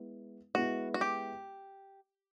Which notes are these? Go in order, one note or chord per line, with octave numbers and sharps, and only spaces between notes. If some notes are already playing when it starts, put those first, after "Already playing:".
Already playing: G#3 B3 E4
G#3 B3 E4 F#4
F#4
G4